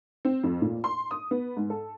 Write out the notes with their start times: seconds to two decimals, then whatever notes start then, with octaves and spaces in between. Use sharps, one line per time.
0.25 C4
0.44 F2
0.62 A#2
0.84 C6
1.11 D#6
1.31 B3
1.57 G#2
1.70 A4